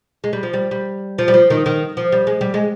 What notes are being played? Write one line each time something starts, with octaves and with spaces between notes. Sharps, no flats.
G#3
G3
F3
G3
G3
F3
G3
F3
D#3
D#3
F3
G3
G#3
G3
G#3